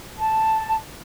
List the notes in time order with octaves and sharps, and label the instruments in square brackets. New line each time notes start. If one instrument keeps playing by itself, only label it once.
[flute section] A5